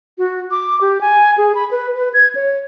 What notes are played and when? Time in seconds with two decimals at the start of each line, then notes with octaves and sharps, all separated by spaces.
0.18 F#4
0.51 D6
0.81 G4
1.01 G#5
1.38 G#4
1.55 B5
1.71 B4
1.96 B4
2.14 G#6
2.35 C#5